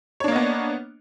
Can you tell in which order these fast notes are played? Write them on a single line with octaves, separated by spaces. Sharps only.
C#5 D4 A#3 D#5 B3